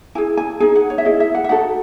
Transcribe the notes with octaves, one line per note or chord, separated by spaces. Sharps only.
E4 G#4 G#5
G#5
D#4 G#4 G#5
F#5
C#5
E5
E4 G#4 D#5
E5
F#5
E5
D#4 F#4 A4 F#5